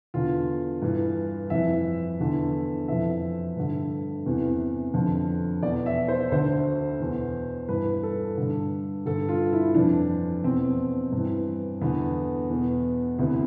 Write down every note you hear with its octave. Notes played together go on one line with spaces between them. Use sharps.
E2 D3 F4
G2 E3
F2 E3 E5
E2 D3
F2 E3 E5
G2 D3
E2 C3 E3
F2 D3
E2 B2 D5
E5
C5
D2 D3 C5
E2 B2
G2 E3 B4
A4
G2 D3
G2 D3 A4
F4
E4
F2 E3 D4
E2 B2 C4
G2
E3
E2 D3 B3
E2 B2
D2 C3 E3 B3